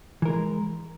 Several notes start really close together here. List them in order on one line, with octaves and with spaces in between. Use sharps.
E3 A#4 G#3